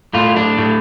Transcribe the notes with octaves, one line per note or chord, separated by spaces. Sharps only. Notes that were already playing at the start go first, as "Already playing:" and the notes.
A2 F4
D4
A2